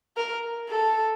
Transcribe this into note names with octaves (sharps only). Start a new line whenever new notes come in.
A#4
A4